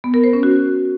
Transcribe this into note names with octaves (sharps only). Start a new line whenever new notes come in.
B3
A#4
C5
C#4
F#4